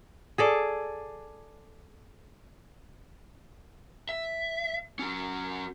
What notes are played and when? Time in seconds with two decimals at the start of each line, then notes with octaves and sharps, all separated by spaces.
0.38 G#4 A4 D5
4.09 E5
4.99 C#4 F#4